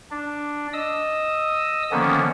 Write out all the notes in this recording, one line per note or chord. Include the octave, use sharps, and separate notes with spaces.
D4
D#5 D#6 E6
D3 D#3 F3 A#3 B3 C#4